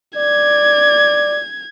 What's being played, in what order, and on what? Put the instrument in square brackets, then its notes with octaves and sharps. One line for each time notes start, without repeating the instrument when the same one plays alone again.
[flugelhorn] D5 [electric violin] G#6